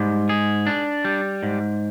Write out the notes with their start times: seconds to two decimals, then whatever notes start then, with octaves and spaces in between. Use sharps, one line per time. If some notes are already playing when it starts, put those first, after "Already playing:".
Already playing: G#2 G3
0.29 G#4
0.67 D4
1.05 G3
1.43 G#2